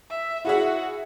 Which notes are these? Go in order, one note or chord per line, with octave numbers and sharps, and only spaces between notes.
E5
E4 F#4 G#4 E5 F#5